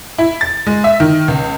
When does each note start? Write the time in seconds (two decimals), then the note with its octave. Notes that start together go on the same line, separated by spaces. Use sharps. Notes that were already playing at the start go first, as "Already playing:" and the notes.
0.18 E4
0.41 A6
0.67 G#3
0.84 E5
1.00 D#3
1.28 C#2